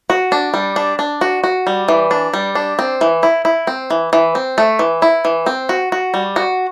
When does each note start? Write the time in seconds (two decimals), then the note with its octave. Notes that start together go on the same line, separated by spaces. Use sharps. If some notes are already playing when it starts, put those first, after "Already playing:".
0.10 F#4
0.32 D4
0.54 G3
0.76 D4
0.99 D4
1.21 F#4
1.44 F#4
1.67 G3
1.88 E3
2.11 D4
2.34 G3
2.55 D4
2.79 C4
3.01 E3
3.23 E4
3.45 E4
3.67 C4
3.90 E3
4.13 E3
4.35 C4
4.58 A3
4.79 E3
5.02 E4
5.25 E3
5.46 C4
5.69 F#4
5.92 F#4
6.14 G3
6.36 F#4